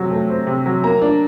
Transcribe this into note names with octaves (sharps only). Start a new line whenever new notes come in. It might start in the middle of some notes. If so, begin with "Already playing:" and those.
Already playing: C3 F#3 A3 C4
A3
C4
C3
F#3
A#3 A#5
D4